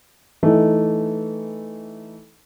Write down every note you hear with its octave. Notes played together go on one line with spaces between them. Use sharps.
E3 A3 D#4